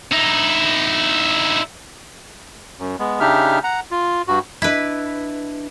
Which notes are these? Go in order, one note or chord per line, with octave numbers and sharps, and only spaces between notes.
D#4 E4
F#2
G#3 B3
C#3 D4 D#4 G4 E5 F6
F#5 A#5
F4
G2 F#4
D4 E4 B4 D#5